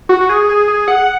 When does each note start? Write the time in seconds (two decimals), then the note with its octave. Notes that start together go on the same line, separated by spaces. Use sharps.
0.09 F#4
0.21 F#4
0.29 G#4
0.49 G#4
0.68 G#4
0.88 F#5